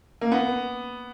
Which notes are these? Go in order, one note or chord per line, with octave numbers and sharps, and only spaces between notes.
A#3
B3